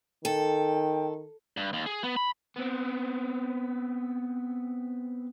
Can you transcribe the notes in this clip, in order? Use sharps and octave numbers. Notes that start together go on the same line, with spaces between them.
D#3 A4 G5
G2
D#2
G#4
B3
B5
B3 C4